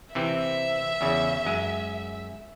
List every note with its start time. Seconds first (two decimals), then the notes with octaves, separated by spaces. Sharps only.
0.15 C3 E3 C4 E5
1.01 E2 C#3
1.46 F#2 G#3